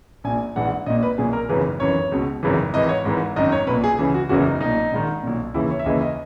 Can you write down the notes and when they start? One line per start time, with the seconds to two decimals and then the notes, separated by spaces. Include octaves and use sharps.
0.24 A#1 A#2 G#5
0.56 A#1 G#2 E3 F#5
0.86 A#1 D#5
0.90 A#2
1.03 B4
1.18 B1 A#2 G#4
1.33 A#4
1.49 G#1 F#2 C#3 E3 B4
1.80 G#1 F#2 E3 C#5
2.12 C#2 B2
2.43 G#1 F#2 C#3 E3
2.74 G#1 G#2 E3 D#5
2.89 C#5
3.05 G#1 G#2 E3
3.36 G#1 F#2 D#3 D#5
3.52 C#5
3.67 B1 B4
3.71 A#2
3.84 G#4
3.99 C#2 C#3 E3 G#4
4.14 F#4
4.29 F#1 E2 C#3 E3 F#4
4.46 D#4
4.61 B1 A#2 D#4
4.92 A#1 G#2 D#3
5.23 B1 A#2
5.54 D#2 C#3 E3 E4
5.70 C#5
5.79 E5
5.86 D#2 C#3 E3 D#5
6.01 D#5